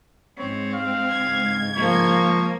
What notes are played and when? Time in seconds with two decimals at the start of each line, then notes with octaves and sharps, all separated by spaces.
0.38 G#2 C4 C#5
0.74 F5
1.10 C#2 G#2 G#6
1.76 F3 A#3 C#6